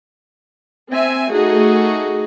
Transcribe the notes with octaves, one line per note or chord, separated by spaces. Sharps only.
C4 E5 G#5
A3 D#4 F#4 G#4